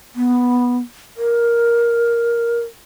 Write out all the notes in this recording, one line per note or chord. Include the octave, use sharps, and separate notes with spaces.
B3
A#4